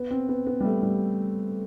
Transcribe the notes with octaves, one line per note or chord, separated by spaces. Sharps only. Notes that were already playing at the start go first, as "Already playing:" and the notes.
Already playing: B3
C4
B3
B3
G3
A3
G3